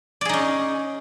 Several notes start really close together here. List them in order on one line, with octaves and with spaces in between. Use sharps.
D5 G#4 D#4 C#4